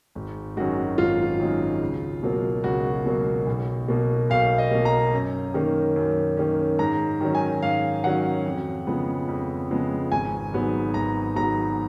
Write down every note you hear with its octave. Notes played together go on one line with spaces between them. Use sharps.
G#1
F#2 D#3 G#3 F#4
G#1 F4
F#2 D#3 G#3
C#2
B2 F#3 A#3
C#2 F#4
B2 F#3 A#3
B1
B2 A#3
B1 F5
D#5
B2 A#3
A#5
F#2
D#3 A#3 C#4
F#2
D#3 A#3 C#4
G#2 A#5
D#3 F#3 C#4
G#5
G#2 F5
D#3 F#3 C#4 F#5
F2
C#3 F3 G#3 B3
F2
C#3 F3 G#3 B3
G#1 G#5
G#2 F#3 B3
G#1 A#5
G#2 F#3 B3 A#5